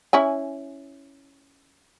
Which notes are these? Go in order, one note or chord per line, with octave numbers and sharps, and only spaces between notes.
C#4 E4 G#5